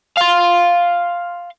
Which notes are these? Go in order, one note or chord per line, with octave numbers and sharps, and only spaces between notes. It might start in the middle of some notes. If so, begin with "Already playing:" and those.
F5 C6